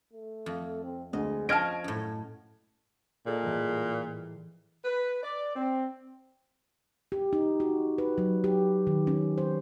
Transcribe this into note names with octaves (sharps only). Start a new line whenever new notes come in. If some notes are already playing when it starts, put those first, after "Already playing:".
A3
F2
C4
D2 G#3 D#5
F3 C#4 D#5 A5 F6 G#6 D7
F#2 A2
A#2 G#4 A4 D#5
A2 E3 G3
B4
D5
C4
G4
D#4
F#4
B4
F#3
G4
D#3
C#4
C5